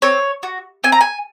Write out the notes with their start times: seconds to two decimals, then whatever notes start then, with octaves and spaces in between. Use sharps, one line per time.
0.02 C4 C#5
0.43 F#4
0.84 C4 G#5
0.92 A#5
1.01 G#5